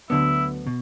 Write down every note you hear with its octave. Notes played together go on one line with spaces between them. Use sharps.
D2 D3 F#3 B3 D4 E4
B2